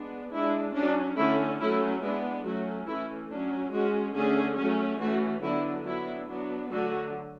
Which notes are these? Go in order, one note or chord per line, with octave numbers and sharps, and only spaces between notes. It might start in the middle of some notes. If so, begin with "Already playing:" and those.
Already playing: G#3 B3 D4
G#3 D4 E4
F#3 C#4 D4
D3 A3 C#4 E4
F#3 A3 C#4 E4
G#3 B3 D4 E4
F#3 A3 C#4 F#4
E3 A3 C#4 E4
F#3 C#4 D4
G#3 C#4 F#4
D3 A3 C#4 G#4
F#3 A3 C#4
E3 A3 C#4 F#4
D3 F#3 B3 D4 E4
F#3 B3 D4 E4
F#3 B3 D4
D3 F#3 A3 F#4